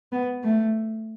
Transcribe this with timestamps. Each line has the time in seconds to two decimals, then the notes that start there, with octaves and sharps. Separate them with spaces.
0.12 B3
0.43 A3